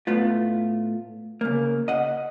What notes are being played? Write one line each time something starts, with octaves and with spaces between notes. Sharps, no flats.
A2 A3 B3 F4
C#3 A#3
D#5 F#5